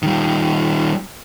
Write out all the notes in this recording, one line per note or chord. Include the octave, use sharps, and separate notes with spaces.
D#3 G3